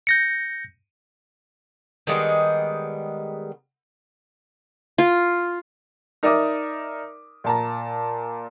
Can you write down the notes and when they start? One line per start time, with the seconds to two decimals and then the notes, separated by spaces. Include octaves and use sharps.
0.07 G6 A#6 C#7
2.07 D#3 G3 G#3 B3
4.98 F4
6.23 D#4 A#4 D5 E5 D6 D#6
7.44 A#2 A5 A#5